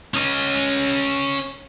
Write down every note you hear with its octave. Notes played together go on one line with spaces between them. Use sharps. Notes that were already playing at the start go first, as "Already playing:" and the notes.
C#4 D#5